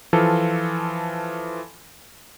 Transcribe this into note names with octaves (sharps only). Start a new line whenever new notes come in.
E3 F3 F4 A4